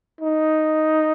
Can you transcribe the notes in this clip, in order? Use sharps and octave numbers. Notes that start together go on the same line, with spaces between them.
D#4